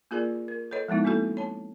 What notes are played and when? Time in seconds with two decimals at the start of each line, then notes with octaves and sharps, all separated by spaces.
0.11 A#3 F4 G#4 A#4 D5
0.48 A#4
0.71 A4 B4 C#5 D#5
0.88 F3 G#3 B3 D#4 E4
1.04 A#3 C4 E4 F#4 A4
1.37 C#5 A5